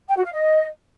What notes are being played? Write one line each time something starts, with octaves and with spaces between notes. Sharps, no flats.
G5
F#4
F5
D#5